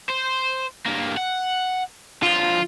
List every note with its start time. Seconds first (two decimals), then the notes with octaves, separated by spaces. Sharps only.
0.10 C5
0.86 G2 A#3
1.17 F#5
2.23 D3 F3 F4